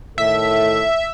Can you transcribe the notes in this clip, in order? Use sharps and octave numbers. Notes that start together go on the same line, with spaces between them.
A2 D#3 A4 E5